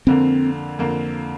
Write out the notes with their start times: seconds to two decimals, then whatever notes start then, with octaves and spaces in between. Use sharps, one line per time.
0.07 F2 D3 A#3 C4
0.79 F2 D3 A#3